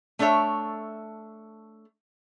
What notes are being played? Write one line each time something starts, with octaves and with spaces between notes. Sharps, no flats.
A3 D4 A4 C#5 E5